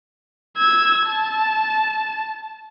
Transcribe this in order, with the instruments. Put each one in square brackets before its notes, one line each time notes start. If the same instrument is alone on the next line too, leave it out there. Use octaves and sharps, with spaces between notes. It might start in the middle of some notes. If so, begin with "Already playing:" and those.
[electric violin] E6 G#6
A5